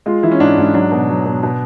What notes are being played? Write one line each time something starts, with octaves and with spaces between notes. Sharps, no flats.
G#3 F4
E3 E4
C#4
G#2 D4
G#2 C#4
F#3 D4
B2
F#3
B2
B2